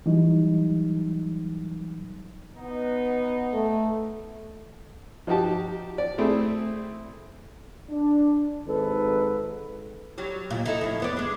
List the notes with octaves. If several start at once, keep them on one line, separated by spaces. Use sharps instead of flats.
E3 F#3 G3 D#4
B3 D#4
A3
F3 D#4 F#4 G4 A5
D5
A3 C4 E4 G#4
D4
G#1 G#2 A4 B4
F#3 G3
D#2 A#2
D#4 E4 A4
F2 A2
F#2 B3 D5
G#3 D4